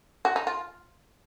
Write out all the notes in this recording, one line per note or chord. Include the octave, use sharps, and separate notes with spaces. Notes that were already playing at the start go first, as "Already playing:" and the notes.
F#4
D#4
F4